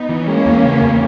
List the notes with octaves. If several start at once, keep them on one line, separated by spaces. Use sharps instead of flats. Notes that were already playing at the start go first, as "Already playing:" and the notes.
Already playing: B3 D#4
E3
G#3 A#3 C#4
E2
C#3
E2